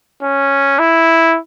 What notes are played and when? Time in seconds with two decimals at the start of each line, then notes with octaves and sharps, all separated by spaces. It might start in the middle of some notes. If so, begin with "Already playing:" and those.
0.23 C#4
0.79 E4